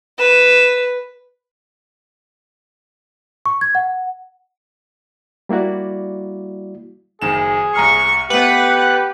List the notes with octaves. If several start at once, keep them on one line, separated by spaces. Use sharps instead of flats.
B4 E7
C#6
G#6
F#5
G3 A#3 E4 F#4 D5
F#1 D#3 G#4 E7
C2 A#5 C#6 F6
A3 B3 G4 B4 F#5